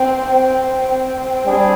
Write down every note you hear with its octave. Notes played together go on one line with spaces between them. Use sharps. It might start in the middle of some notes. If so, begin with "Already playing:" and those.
Already playing: C4
C4
C4
G3 D4 G#4